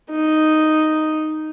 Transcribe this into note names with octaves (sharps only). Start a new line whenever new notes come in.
D#4